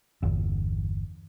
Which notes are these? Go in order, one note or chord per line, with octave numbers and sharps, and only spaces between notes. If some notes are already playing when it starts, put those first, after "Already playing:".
G1 E2